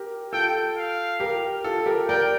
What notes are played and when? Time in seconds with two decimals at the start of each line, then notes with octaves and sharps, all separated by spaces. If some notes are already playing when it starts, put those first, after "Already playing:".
Already playing: G4 A#4
0.33 F4 A4 G5
0.77 F5
1.20 G4 A#4
1.64 F4 A4
1.86 G4 A#4
2.08 A#4 D5 G5